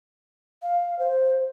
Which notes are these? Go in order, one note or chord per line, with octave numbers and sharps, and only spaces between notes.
F5
C5